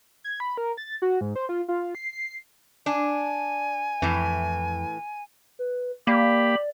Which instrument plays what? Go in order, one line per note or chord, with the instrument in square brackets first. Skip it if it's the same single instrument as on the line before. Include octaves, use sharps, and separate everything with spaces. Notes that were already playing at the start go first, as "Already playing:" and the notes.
[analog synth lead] G#6
B5
A#4
A6
F#4
G#2
C5
F4
F4
C7
C7
[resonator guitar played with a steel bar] D4 [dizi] G#5
[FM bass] F2 [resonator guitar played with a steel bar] A2 E3
[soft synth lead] B4
[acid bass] A#3 [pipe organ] G4 B5 [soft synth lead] D5